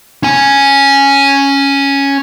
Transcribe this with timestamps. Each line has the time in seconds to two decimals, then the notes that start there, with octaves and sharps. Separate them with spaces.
0.23 C#4 G#5